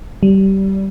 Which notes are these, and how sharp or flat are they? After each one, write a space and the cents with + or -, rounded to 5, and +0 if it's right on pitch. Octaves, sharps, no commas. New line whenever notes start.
G3 -20